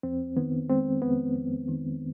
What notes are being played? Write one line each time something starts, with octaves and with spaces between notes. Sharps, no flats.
F2 C4
D#3 B3
G#3 C4
F2 B3
F2
D#3